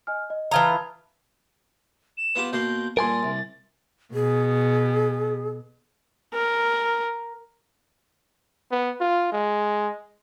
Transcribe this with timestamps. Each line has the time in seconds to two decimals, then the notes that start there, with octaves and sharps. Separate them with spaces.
0.07 D#5 G#5 F6
0.30 D#5
0.51 E3 F4 A5 A#5 D#6 G#6
2.18 E7
2.36 B3 F4 G4
2.53 B2 A#3 C6 G6
2.97 G2 A#2 A#4 G#5 C6 A6
3.23 C2
4.14 B2 G#4
6.34 A#4
8.71 B3
9.00 F4
9.32 G#3